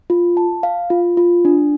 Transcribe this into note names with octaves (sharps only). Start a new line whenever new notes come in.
F4
A5
F5
F4
F4
D4